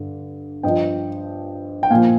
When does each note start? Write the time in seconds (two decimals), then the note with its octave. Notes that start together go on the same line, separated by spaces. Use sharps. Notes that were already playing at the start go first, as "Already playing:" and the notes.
Already playing: G2 D3
0.63 G2 F3 D#5 G5
1.83 G5
1.90 A#2 F3 F5 G#5